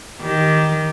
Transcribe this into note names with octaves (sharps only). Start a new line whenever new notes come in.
D#3 G4